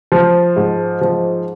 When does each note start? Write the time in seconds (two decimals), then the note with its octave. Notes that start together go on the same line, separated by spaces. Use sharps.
0.12 F3
0.56 G#2
1.01 F3